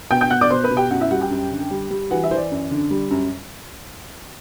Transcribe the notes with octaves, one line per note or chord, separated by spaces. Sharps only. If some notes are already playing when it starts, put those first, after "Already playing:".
B2 G5 G6
G5 G6
B2 F#5 F#6
D5 D6
B2 C5 C6
B4 B5
B2
G4 G5
F#2 F#4 F#5
E4 E5
G3 F#4 F#5
G4 G5
F#2
D3
G3
G3
E3 F#4 F#5
E4 E5
E3 C5
D5
F#2
D3
G3
F#2